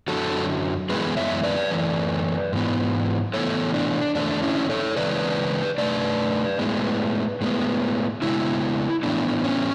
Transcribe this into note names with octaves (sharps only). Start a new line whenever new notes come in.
F#2 D3 F#3 F#4 A4
F#2 E3 G#3 B3 G#4 B4
C#5 E5
B4 D5
F#2 E3 A3
G#2 E3 B3
A2 E3 B3 A4 C#5
D4
E2 D3 A3 D4
C#4 E4
A4 C#5
C#3 E3 G#3 B4 D5
F#2 D3 A3 B4 D5
A2 G#3 B3
A2 G#3 B3
C#3 G#3 B3 C#4 E4
A2 E3 B3 D4
C#4